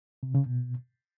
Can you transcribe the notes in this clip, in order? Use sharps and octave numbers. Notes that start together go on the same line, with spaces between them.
C3
C#3
B2